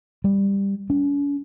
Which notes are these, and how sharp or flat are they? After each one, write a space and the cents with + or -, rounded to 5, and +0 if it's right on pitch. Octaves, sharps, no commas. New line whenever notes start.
G3 +10
C#4 +45